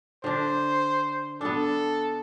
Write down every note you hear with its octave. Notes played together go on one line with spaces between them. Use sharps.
D3 D4 C5
B3 D4 A4